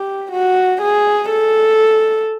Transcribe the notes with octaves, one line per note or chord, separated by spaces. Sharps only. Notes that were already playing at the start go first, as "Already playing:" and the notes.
Already playing: G4
F#4
G#4
A4